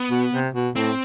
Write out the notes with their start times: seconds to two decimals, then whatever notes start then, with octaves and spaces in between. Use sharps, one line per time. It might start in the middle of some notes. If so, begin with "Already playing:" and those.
Already playing: B3
0.11 B2
0.33 C3
0.54 B2
0.76 A2 C4